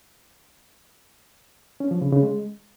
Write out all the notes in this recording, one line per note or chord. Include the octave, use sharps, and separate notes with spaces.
C#4
F3
C#3
C#3
G#3